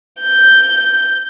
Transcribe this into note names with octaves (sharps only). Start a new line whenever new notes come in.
G6